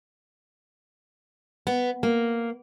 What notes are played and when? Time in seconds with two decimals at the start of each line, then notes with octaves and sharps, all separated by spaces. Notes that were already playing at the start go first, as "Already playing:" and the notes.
1.67 B3
2.03 A#3